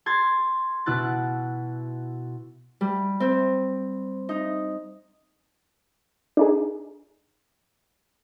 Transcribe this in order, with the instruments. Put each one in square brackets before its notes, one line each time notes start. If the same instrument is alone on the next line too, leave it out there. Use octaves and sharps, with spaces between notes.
[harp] C6 G#6 A6
B2 E4 F#6 A6
G3
C4
D#4
[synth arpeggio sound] D4 D#4 G#4